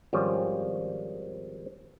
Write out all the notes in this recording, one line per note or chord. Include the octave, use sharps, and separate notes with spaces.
G#1 F3 G3 C#4 C#5